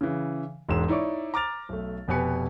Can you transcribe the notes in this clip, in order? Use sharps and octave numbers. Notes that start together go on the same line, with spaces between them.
C#3 E3
E1 G#2 E6 E7
D#4 E4 C#5 D5 C#6
A#5 D6 F6 A6 F7
B1 A3
F1 B2 G4 B4 G#5 C#7